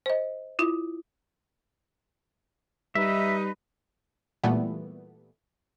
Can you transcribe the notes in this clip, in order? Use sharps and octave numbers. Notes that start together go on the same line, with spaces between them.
C5 D#5
E4 F4
G3 D#4 B4 E5
A#2 E3 G3 A3 B3